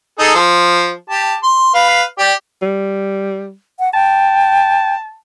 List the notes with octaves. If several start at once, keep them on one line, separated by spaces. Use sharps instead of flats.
D#4 G#4 A4
F3
G4 A5
C6
B4 F5
G4 D5
G3
F#5
G5 A5